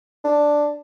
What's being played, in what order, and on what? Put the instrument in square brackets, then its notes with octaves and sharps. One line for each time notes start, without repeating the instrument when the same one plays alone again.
[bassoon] D4